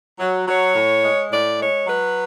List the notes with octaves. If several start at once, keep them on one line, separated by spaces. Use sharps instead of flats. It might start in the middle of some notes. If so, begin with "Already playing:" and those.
F#3
F#3 C#5
A2
G#3
A2 D5
G#3 C#5
F#3 B4